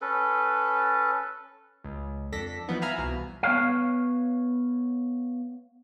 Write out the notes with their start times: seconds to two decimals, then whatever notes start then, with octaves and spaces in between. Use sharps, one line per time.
0.02 C#4 A4 B4
1.84 C#2
2.32 F2 D4 A4 A#6 B6
2.68 E3 F3 B3 D#4
2.82 E5 F5 G#5 A#5 B5 F6
2.98 C2 B2 E3
3.43 B3 C#5 F5